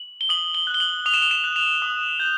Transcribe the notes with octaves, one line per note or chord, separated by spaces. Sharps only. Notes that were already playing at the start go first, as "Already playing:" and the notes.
Already playing: F#7
G7
D#6 F#7
G7
F#6
G7
F#7
D#6 F7
E7
F7
E7
F#6
F7
D#6
G6